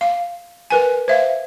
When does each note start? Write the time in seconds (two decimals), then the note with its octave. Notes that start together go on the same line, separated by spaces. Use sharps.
0.01 F5
0.70 A#4 B4 G#5
1.08 C5 E5 F5